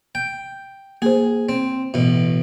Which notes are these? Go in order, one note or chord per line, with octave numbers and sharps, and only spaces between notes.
G5
A#3 G#4 C5
C4
A1 B2